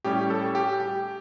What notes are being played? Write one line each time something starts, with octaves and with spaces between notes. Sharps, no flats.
A2 G3 C#4 G4
A4
G4
G4